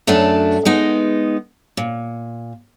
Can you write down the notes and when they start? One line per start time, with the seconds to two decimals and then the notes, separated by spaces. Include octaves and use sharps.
0.07 F#2 A3 D4 F#4 A5
0.65 G#3 B3 D#4
1.77 A#2